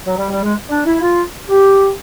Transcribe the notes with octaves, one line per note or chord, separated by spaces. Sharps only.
F#3
G3
G3
G#3
D4
E4
F4
G4